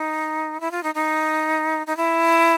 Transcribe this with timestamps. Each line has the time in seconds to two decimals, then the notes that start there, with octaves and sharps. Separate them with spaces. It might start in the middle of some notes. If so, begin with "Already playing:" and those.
Already playing: D#4
0.60 E4
0.71 F4
0.83 D#4
0.95 D#4
1.87 D#4
1.97 E4